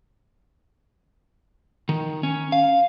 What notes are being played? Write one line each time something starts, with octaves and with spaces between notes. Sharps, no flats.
D#3
C#4
F5